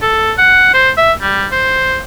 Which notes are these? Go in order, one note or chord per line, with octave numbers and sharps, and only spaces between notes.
A4
F#5
C5
E5
G3
C5